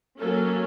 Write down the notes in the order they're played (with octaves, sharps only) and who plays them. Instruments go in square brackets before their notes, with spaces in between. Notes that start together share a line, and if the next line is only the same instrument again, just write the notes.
[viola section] F#3 A#3 C#4 A4